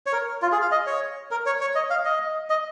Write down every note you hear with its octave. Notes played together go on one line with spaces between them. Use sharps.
C#5
A#4
F4
G#4
F5
D#5
C#5
A#4
C#5
C#5
D#5
F5
D#5
D#5